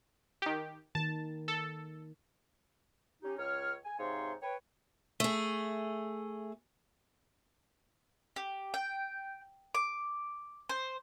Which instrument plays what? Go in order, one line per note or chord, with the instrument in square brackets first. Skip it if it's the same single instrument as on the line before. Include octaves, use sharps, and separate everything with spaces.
[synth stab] D#3 G4
[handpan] D#3 [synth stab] A5
[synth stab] A4
[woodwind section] C#4 D#4 G4
C#2 C#5 F6
G#5
G#2 C3 D#4 C#5 F5 C6
B4 C#5 G5
[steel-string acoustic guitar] A3 G#4
[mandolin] G4
G5
D6
C5